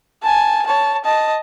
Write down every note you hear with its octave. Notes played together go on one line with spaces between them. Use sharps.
G#5 A5
C#5 A5
D#5 A5